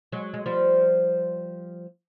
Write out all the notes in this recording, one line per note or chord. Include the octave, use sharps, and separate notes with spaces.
F#3 G#3
G#3
F3 G3